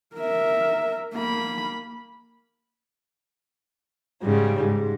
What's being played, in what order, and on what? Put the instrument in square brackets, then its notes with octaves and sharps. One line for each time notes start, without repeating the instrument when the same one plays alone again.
[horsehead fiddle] A#4 E5
A#3 B5
[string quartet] G#2 C#3 G3
G#2